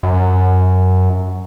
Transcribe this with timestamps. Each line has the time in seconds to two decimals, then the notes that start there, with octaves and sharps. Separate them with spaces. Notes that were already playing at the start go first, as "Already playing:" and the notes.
0.03 F#2